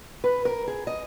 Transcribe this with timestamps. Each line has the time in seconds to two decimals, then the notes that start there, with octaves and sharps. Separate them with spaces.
0.24 B4
0.45 A#4
0.68 G#4
0.87 D#5